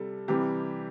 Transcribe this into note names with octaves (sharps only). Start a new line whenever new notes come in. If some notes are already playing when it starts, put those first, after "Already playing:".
Already playing: C3 G3 A4
C3 E3 G3 G4